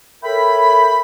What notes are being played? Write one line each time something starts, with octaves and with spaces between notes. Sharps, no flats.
A4 A#4 C#5 E5 G5 B5